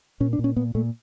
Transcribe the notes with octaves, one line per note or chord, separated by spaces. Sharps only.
A#2 C#4
D4
A#2
C#4
A#2 B3
A#2 A3